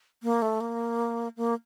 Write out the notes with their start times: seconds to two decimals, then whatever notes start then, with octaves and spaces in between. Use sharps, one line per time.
0.23 A#3
0.42 A3
0.61 A#3
1.37 A#3